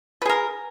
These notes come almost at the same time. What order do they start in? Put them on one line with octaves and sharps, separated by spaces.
B4 G#4 A#4